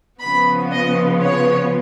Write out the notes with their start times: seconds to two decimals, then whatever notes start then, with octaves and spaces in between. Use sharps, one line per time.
0.21 C#3 F3 B3 B5
0.72 D#5
1.23 C#5